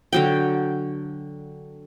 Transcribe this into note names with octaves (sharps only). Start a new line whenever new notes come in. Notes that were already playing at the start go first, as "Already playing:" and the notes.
D3 F#3 G5